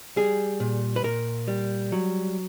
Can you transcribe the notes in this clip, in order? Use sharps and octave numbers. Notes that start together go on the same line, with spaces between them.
G3 G#4
A#2
B4
A#2 A#4
G3
F#3